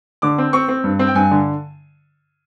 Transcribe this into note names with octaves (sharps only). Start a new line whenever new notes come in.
D3 D6
C4
C4 C#6
C4
G2
C4
G5
G2 G#5
D3